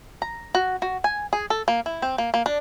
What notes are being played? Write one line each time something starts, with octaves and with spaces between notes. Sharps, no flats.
A#5
F#4
F#4
G#5
G#4
A4
A#3
E4
C4
A#3
A#3
D4